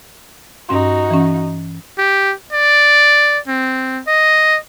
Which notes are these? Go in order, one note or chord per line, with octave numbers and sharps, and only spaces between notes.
G2 C#4 D#4 F#4 C6
E3 C#4
G4
D5
C4
D#5